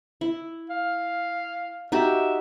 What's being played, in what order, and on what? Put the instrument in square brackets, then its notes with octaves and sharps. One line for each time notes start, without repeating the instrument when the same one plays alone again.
[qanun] E4
[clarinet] F5
[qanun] D#4 F#4 G4 [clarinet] E5